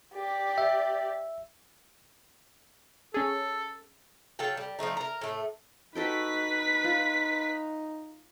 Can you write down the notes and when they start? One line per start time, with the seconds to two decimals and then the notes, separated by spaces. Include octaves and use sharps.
0.14 G4 D5
0.58 E5
3.14 C#4 G#4 A4
4.39 F#3 A4 F5 G5
4.57 G3
4.79 F3 G3 A3 D#4
4.97 A#4 A#5
5.21 A2 A3
5.95 D#4 F#4 A4 B4 G5 B6
6.84 F4